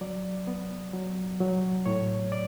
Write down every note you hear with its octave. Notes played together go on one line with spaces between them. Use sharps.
F#3 D5
B3
F#3
F#3
A2 C#5
D5